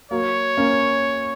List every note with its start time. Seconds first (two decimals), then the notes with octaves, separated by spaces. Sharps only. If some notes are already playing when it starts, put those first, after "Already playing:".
0.11 F#3 A#3 C#5
0.57 A#3 C#4